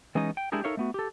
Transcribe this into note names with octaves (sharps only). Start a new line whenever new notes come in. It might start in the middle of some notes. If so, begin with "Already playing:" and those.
E3 G#3 B3 C#4 D#4 D#5
G5
G#3 D4 E4 G4 G#4 A#4
D#4 A4 A#4 C#5 E5 F5
A3 B3 F#4
G4 A4